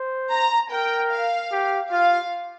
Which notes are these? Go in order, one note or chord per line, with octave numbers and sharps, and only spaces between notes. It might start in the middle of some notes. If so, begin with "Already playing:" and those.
Already playing: C5
A#5
A#4 G5
F5
G4
F4 F5